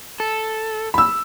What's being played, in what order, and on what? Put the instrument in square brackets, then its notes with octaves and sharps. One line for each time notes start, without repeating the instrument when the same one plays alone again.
[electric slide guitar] A4
[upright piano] B5 E6